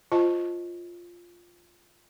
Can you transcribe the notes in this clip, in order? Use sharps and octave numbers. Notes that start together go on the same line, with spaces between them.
F4 C5 D#5 A5